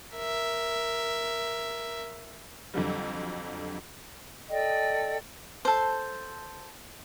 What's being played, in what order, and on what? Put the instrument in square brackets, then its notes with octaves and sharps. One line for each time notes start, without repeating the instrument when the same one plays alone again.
[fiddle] A#4 E5
[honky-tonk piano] F2 D3 F#3 G3
[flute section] A4 D5 D#5 G5
[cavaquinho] A4 C5